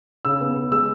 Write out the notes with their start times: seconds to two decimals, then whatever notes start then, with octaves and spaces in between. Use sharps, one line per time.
0.25 C#3 E6
0.41 B3
0.56 C#3
0.72 G#3 E6